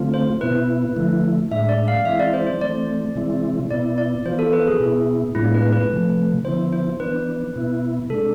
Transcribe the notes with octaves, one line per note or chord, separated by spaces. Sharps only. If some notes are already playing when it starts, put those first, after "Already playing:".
Already playing: D3 A3 C4 F4
C5
B2 B3 E4 B4
D3 F3 A3 E4
A2 G#3 D4 E5
D5
F5
E3 G#3 C4 E4 E5
D5
C5
C5
E3 A3 C4 D5
C3 E3 G#3 C4 E4
B2 B3 E4 D5
D5
E3 B3 F4 C5
A4
B4
G#4
B2 B3 E4
A2 G#3 B3 D4 E4 F4
B4
B4
C3 F3 A3
D3 F3 B3 E4 C5
C5
E3 B3 D4 B4
B2 B3 E4
C3 G#3 D4 A4